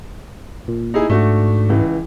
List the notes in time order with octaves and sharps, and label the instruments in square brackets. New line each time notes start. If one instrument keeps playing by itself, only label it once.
[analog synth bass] A#2
[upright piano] D#4 E4 G#4
[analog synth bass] G#2 [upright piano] A3 D4 F#4
[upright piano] C#2 E3